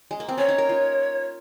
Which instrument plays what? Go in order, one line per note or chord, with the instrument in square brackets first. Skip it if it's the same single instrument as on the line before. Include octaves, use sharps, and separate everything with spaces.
[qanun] G#3
A#3
C4
[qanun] C#4 [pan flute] C#5
[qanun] D#4
A#4
F4